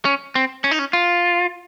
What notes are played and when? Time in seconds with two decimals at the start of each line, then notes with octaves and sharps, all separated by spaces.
0.05 C#4
0.35 C4
0.64 C#4
0.71 D#4
0.79 C#4
0.93 F4